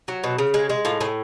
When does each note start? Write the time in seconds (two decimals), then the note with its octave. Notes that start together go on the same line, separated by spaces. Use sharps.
0.08 F#3
0.24 B2
0.38 C#3
0.54 G#3
0.70 G#3
0.85 A2 F4
1.01 A2 G#4